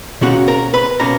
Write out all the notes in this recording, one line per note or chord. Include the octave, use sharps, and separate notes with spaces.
C#2 B2 A#3 C#4 F#4 F#5
A#4 A#5
B4 B5
B2 A#3 C#4 A#4 A#5